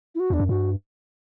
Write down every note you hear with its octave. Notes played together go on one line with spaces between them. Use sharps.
E4
F#4
E2 D4
F#2
G2 F#4